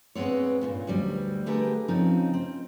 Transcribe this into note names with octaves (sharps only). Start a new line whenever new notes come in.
G2 G#3 B3 C4 C#5
G2 A#2 C#4
D2 F#3 G3
D3 A3 G4 G#4 A#4 B4
C#3 F3 C4 C#4 D#4
C4